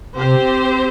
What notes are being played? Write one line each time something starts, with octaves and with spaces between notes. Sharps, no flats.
C3 C4 G4 C5